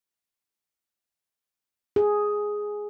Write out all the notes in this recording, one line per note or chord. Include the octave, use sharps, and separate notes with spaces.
G#4